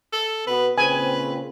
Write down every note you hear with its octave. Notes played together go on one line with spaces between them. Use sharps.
A4
B2 B3 B4
A#2 C#3 C4 B4 G#5